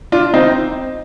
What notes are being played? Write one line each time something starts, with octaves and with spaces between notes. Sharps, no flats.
D4 F4
C4 D#4